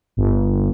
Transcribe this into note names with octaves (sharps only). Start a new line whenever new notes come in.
G1